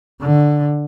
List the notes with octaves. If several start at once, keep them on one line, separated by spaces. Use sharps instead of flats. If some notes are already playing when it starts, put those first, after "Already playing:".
D3